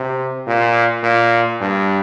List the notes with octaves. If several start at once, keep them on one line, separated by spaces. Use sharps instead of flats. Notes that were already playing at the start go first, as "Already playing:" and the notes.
Already playing: C3
A#2
A#2
G2